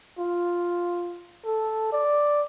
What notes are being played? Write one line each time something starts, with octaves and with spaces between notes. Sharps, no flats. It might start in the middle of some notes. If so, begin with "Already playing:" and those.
F4
A4
D5